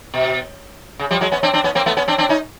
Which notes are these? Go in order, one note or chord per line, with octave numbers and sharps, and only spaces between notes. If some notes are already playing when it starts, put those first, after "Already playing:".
B2
C#3
F3 G3
F#3 G#3
B3 C#4
C4 D4
C4 D4
B3 C#4
A#3 C4
A3 B3
B3 C#4
C4 D4
C4 D4
C#4 D#4